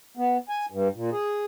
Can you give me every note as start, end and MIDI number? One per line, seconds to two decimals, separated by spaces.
0.17 0.37 59
0.49 0.66 80
0.71 0.88 43
0.95 1.10 46
1.12 1.45 68